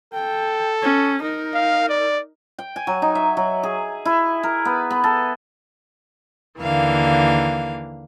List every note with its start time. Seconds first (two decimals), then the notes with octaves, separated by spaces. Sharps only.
0.14 A4 G5
0.82 C#4
1.23 D#4 A#4
1.54 F5
1.89 D5
2.59 G5
2.76 G#5
2.87 F#3
3.02 D#4
3.15 E5
3.37 F#3
3.63 G#4
4.05 E4
4.43 A#4
4.65 B3
4.91 B3
5.04 A4
6.60 D#2 D3 E3 A#3 F5